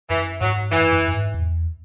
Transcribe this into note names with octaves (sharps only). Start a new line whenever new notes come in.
F#2 E3
G#2 F#3
F#2 E3
F#2
F#2
G#2
E2